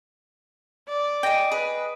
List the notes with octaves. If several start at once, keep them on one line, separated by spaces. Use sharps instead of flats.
D5
G#4 D#5 G5 A#6 D7
G#4 B4